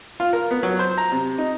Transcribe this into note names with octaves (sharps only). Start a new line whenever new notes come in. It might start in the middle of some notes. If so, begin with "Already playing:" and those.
F4
A#4
B3
F#3
C5
A#5
C3
D#4